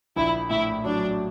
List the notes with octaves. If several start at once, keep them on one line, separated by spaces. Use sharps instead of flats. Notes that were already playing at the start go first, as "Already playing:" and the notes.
A#1 E4
A2 E4
F#3 D4